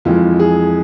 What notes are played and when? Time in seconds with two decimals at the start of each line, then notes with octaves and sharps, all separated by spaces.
0.05 F2 E3 G#3 F4
0.39 G#4